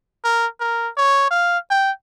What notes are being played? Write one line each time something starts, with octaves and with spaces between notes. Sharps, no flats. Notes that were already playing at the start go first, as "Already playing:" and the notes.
A#4
A#4
C#5
F5
G5